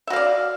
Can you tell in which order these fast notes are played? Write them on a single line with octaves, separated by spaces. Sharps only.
E5 F#4 F5 D5